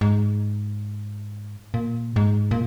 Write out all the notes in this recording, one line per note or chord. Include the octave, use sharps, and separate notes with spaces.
G#2
A#2
G#2
A#2